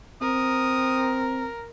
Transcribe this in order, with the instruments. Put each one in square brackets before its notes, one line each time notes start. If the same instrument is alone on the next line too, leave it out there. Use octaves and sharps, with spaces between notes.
[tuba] C4 [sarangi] A#4 [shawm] D#6